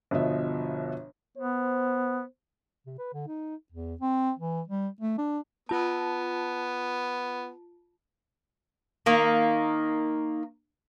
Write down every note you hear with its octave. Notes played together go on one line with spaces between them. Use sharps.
G1 B2 F3 D#5 E5
B3 C5
C3
B4
D3
D#4
E2
C4
E3
G3
A3
D4
B3 F4 A5
D#3 A#3